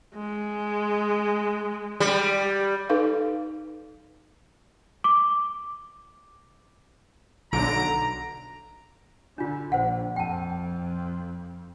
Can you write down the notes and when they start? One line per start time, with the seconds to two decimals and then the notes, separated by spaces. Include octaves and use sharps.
0.14 G#3
2.00 G3
2.89 D#4 A4 B4 F5
5.04 D6
7.53 B1 D3 A#5 D7
9.38 D3 D4 F4
9.72 A#1 C5 F#5
10.16 F2 G5 A5